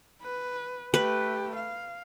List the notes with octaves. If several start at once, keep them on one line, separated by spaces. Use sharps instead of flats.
B4
A3 G4 B4
F5